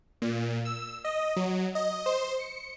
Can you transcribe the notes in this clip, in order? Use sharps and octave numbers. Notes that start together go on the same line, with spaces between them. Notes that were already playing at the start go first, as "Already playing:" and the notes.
A#2
E6
D#5
F#3
D#5
C5
C#7